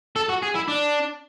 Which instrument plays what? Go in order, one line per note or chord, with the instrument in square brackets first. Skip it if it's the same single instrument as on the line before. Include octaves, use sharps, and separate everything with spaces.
[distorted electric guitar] A4
F#4
G#4
E4
D4